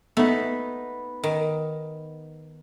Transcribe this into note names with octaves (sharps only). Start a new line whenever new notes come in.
A3 B3 D#4 B4
D#3